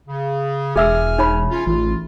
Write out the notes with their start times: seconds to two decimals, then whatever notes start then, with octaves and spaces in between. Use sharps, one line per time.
0.08 C#3
0.76 E1 G#4 E5 G#5 E6 F6
1.18 D#4 C#5 B5
1.51 C#4 F4
1.67 A1 F4